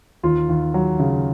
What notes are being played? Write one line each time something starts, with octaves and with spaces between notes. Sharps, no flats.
D#2 F4
D#2
F#3
C#3